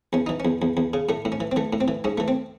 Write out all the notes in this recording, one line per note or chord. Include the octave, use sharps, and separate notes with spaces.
E2 C#4
E3 D#4
E2 C#4
E2
E2
C#3
A2 A3
A2
C#4
E3
C4
E3 A3
A2
C4
E3
G#2 C#4
E3 A3
C4